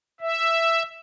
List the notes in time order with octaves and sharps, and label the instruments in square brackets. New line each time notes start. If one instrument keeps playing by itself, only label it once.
[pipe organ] E5